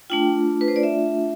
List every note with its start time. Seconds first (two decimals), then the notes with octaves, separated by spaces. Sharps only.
0.10 A3 D4 F4 G5
0.61 B4
0.68 C5
0.76 D5
0.83 E5